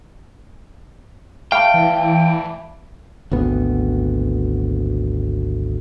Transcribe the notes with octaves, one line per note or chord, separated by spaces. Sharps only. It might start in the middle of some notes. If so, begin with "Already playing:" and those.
A3 D5 F5 G5 B5
E3
G#1 D2 B3